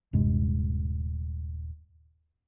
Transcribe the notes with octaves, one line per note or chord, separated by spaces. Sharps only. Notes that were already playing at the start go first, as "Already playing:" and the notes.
D#1 G2 C3 G#3